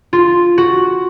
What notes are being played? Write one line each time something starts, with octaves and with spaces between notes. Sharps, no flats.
F4
F#4